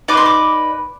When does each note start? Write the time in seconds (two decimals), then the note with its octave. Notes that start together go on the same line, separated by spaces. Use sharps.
0.08 D#4 B4 D5 D6
0.17 C6
0.26 D6